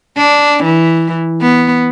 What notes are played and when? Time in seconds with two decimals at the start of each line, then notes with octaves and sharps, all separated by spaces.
0.17 D4
0.64 E3
1.41 B3